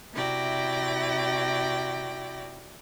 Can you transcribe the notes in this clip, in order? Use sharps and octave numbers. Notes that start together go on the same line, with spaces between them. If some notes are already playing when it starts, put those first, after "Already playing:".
C3 E4 F#4 D5 G5 A#6